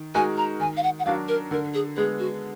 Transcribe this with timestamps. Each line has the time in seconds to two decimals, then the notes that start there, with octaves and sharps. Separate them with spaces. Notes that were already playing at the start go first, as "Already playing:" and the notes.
Already playing: D#3
0.15 G#3 D#4 F#4 A#4 G#5
0.37 A#5
0.60 D#3 G#5
0.77 F5
0.83 F#5
0.99 F#5
1.05 F#3 D4 F#4 A#4 F5
1.28 A#4
1.51 D3 A#4
1.74 G#4
1.97 G#3 B3 G#4
2.19 F#4